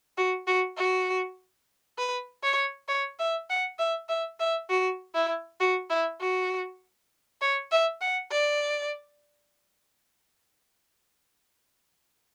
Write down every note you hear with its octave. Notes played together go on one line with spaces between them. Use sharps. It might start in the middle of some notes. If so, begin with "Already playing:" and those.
F#4
F#4
F#4
B4
C#5
C#5
E5
F#5
E5
E5
E5
F#4
E4
F#4
E4
F#4
C#5
E5
F#5
D5